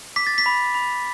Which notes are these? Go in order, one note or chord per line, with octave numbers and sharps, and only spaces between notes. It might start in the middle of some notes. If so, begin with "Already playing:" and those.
D6 B6
A6
B6
B5
B5